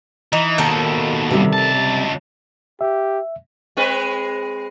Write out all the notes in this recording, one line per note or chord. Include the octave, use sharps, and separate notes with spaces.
E3 D#4
D#2 B2 D#3 A4
C3 G3
C#2 A5
G4 E5
G#3 C4 B4